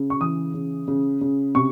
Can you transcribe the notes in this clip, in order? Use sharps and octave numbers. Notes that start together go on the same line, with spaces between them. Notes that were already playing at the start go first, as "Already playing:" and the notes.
Already playing: C#3
C#6
E3 D#6
C#3
C#3
C#3
C3 C#6